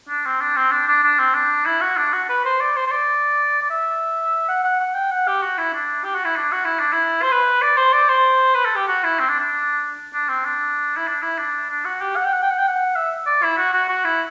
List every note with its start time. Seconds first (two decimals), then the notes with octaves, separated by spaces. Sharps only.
0.09 D4
0.25 C4
0.41 D4
0.56 C4
0.71 D4
0.88 D4
1.03 D4
1.19 C4
1.34 D4
1.66 E4
1.81 F#4
1.97 D4
2.13 F#4
2.29 B4
2.45 C5
2.60 D5
2.76 C5
2.86 C5
2.91 D5
3.62 D5
3.70 E5
4.48 F#5
4.64 F#5
4.80 F#5
4.95 G5
5.11 F#5
5.27 G4
5.43 F#4
5.58 E4
5.74 D4
6.04 G4
6.15 F#4
6.25 E4
6.36 D4
6.52 F#4
6.65 E4
6.79 D4
6.93 E4
7.22 C5
7.31 B4
7.62 D5
7.77 C5
7.93 D5
8.09 C5
8.54 B4
8.65 A4
8.75 G4
8.88 F#4
9.04 E4
9.19 C4
9.29 D4
9.40 D4
10.13 D4
10.28 C4
10.45 D4
10.96 E4
11.07 D4
11.22 E4
11.38 D4
11.70 D4
11.85 F#4
12.01 G4
12.16 F#5
12.25 G5
12.33 F#5
12.42 G5
12.50 F#5
12.58 G5
12.68 F#5
12.96 E5
13.26 D5
13.43 E4
13.57 F#4
13.73 F#4
13.89 F#4
14.05 E4